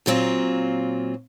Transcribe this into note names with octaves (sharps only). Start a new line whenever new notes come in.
A#2 F#3 C4 F4